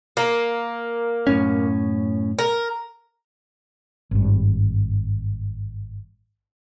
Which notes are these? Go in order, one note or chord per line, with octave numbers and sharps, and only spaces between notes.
A#3
F#2 A2 C#4
A#4
G#1 G2